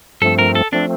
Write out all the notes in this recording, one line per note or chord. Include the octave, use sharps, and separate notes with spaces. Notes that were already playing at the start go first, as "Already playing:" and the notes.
G2 F3 A3 C4 A4
A#4
A4
F3 A3 C4 D4